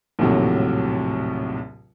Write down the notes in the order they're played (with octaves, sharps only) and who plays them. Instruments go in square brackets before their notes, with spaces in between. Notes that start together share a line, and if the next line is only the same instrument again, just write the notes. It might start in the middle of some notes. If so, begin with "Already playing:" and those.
[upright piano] A#1 D#2 A2 C3 F#3